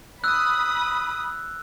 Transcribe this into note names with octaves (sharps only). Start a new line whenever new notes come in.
B5 D#6 E6 F#6